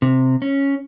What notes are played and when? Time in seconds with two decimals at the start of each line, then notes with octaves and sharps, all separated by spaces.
0.02 C3
0.42 C#4